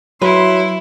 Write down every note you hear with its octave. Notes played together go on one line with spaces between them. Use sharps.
F#3 E4 B4 C6